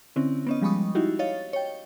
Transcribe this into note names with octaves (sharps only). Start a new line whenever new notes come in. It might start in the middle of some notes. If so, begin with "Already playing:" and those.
D3 C4 C#4 E4
B3 C#4 D#5
F3 G3 G#3 B5 C#6 D#6
D#4 E4 F#4 G4
C#5 D#5 F5 A6
C#5 G5